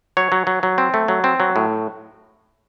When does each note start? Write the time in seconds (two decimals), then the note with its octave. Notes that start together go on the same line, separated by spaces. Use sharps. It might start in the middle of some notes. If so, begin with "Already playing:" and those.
0.17 F#3 C#5
0.32 F#3
0.47 F#3
0.63 F#3
0.78 C4
0.94 A3
1.08 F#3
1.24 C4
1.40 F#3
1.56 A2